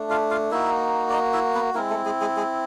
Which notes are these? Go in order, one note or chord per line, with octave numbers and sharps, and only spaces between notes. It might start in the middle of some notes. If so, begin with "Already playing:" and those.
Already playing: A3 D4
F4 F5
F4 F5
A#3 D#4 E4 F#4 E5
D5
D#4 D#5
E4 E5
B3 B4
G#3 A#3 C4 E4 A#4
A3 A4
G#3 G#4
G#3 G#4
G#3 G#4